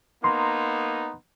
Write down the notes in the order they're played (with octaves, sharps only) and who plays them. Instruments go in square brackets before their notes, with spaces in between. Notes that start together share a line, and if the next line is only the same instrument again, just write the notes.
[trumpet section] A#3 B3 D#4 [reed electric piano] C6